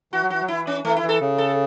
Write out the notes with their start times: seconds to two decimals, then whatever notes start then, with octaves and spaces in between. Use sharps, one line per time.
0.13 E3 F#4
0.22 F#3
0.30 E3 F#4
0.41 F#3
0.48 E3 E4
0.67 C#4
0.85 E3 A3
0.97 E4
1.03 E3
1.09 A4
1.21 C#3
1.38 A4